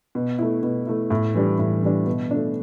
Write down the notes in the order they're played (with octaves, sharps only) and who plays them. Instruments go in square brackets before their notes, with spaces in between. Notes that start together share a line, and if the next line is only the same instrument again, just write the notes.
[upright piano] B2
A3 E4
B2
A3 E4
A2
E3 G3 D4
A2
E3 G3 D4
B2
A3 D4